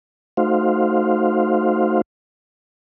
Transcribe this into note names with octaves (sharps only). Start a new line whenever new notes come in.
A3 D#4 F#4 C5 F5